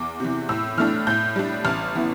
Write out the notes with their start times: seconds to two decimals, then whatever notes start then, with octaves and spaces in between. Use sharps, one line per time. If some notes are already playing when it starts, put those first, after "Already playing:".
Already playing: E2 D6
0.20 C3 E3
0.49 A2 E6
0.77 E3 A3 D4 F6
1.07 A2 G6
1.36 G3 D4
1.65 A1 F6
1.95 E3 B3